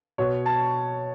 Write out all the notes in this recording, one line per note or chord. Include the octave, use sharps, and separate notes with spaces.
B2 C#5
A5